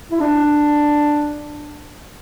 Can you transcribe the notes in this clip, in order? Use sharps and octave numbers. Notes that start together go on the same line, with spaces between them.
E4
D4